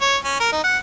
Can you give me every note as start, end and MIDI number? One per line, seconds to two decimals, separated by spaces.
0.02 0.16 73
0.24 0.39 61
0.40 0.50 70
0.52 0.60 63
0.64 0.77 78